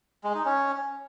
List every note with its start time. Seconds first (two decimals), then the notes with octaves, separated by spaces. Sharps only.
0.24 G#3
0.35 D#4
0.45 C#4